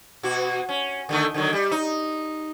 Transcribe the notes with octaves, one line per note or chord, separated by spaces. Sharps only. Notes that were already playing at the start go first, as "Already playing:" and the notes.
B2 F#4
C#4
D3 D#3 A3
D3 D#3 F#3
G3
D#4